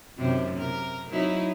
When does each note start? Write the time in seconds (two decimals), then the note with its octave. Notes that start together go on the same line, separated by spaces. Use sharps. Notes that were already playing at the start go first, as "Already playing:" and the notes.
0.18 F#2 C3 D#3
0.57 C3 A#4
1.10 F#3 D#4 E4